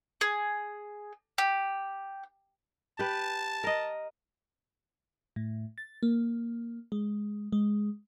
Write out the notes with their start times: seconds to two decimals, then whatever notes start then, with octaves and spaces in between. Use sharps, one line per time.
0.21 G#4
1.38 G4
2.99 G4 B4 A5
3.64 A#4 D#5
5.36 A2
5.78 A6
6.03 A#3
6.92 G#3
7.52 G#3